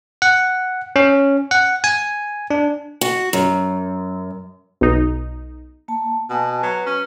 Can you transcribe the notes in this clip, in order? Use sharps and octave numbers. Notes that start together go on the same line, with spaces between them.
F#5
C#4
F#5
G#5
D4
F#4
F#2
B1 D#4
A#3 A5
B2 G#5 A5
F#3 B4
C#4